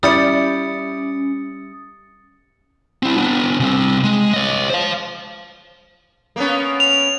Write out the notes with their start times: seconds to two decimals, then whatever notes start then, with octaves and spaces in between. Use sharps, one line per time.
0.03 G3 C#4 E4 D5 D#6 A6 C#7
3.03 C4 E4
3.17 B3 D4
3.60 C2 C4
4.04 G#3
4.33 C#5 D#5
4.70 C5 F5
6.36 A#3 B3 C#4
6.80 F7